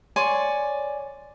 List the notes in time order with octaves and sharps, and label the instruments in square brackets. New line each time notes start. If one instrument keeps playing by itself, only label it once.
[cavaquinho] C#5 D5 G#5 C6